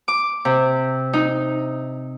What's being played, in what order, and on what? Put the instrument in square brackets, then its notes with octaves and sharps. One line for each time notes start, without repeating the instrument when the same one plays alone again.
[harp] D6
C3
D#4